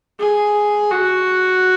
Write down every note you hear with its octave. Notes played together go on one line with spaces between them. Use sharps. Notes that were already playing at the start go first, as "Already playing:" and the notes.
G#4
F#4